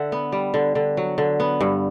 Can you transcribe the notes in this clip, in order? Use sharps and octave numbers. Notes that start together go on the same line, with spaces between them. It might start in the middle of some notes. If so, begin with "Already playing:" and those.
Already playing: D3 E5 F#5
B3
G3
D3
D3
F#3
D3
B3
G2